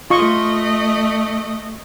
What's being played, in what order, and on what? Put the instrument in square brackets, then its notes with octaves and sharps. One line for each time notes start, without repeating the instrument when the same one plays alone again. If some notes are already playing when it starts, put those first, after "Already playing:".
[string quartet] A3 D#5 [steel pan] F4 C#6